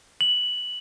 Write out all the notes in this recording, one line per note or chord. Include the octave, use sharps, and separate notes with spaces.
F#7